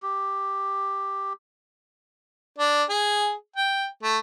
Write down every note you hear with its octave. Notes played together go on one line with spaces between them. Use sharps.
G4
D4
G#4
G5
A3